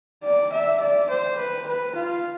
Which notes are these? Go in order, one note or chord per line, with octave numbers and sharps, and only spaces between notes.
D5
E5
D5
C5
B4
B4
F4